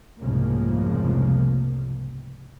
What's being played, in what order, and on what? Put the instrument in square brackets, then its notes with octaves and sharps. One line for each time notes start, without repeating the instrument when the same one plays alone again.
[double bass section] F1 C2 G#2 C#3 F3 A#3